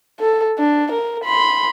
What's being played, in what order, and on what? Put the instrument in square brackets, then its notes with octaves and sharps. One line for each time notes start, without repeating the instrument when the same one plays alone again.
[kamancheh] A4
D4
A#4
B5 C6